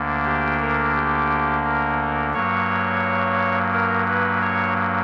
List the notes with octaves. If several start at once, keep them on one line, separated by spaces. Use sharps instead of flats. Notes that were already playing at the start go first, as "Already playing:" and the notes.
Already playing: D2 D3 A#3 D4
G4
A#4
G4
A#4
G2 F#3 A#3 C#5
A#4
B4
C#5